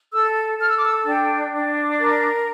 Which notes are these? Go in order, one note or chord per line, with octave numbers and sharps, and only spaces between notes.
A4 E6
A4 F6
E6
D6
E6
D4 G5
D4
A#4